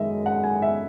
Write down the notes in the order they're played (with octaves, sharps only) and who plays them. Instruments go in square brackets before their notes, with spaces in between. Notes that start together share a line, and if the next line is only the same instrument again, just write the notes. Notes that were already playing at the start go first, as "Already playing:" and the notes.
Already playing: [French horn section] F#2 D#3 G#3 [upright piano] D#5 E5
[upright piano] F#5
G#5
E5